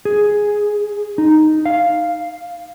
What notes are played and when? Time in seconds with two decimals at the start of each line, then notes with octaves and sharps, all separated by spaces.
0.05 G#4
1.18 D#4
1.66 F5